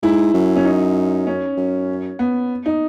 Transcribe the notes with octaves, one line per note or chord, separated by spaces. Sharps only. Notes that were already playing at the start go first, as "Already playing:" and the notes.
G#2 E4
F#2
C#4
D#4
C#4
F#2
B3
D#4